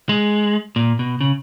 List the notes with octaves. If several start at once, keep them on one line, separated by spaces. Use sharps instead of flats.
G#3
A#2
B2
C#3